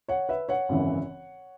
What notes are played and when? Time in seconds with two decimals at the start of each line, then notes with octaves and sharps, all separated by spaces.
0.08 C#5 F#5
0.29 B4 E5
0.49 C#5 F#5
0.69 G#1 F#2 C#3 E3